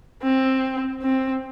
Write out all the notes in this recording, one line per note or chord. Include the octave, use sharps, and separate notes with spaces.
C4
C4